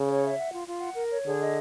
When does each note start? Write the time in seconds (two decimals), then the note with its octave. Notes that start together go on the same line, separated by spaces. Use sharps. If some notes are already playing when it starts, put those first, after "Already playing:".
Already playing: C#3
0.08 C#5
0.23 E5
0.37 F#5
0.52 F4
0.66 F4
0.81 F#5
0.96 A#4
1.11 C#5
1.25 D3 G#4
1.40 D#5